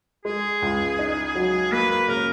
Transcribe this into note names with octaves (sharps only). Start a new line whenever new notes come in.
G#3 G#4
C#2
D#4
F#3
A#3 B4
B4
C#3 A#4